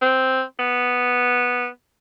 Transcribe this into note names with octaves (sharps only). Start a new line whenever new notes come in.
C4
B3